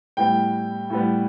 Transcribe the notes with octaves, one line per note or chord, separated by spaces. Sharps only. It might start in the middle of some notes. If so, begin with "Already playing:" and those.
A2 G3 B3 G5
A2 G3 B3